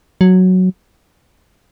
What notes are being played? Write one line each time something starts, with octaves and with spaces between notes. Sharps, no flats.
F#3